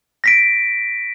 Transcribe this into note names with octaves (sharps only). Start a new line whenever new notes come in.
A#6 B6 D7